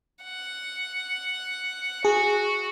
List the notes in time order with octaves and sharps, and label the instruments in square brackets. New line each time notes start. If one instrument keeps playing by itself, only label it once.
[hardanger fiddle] F#5
[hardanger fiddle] F#4 [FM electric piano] G#4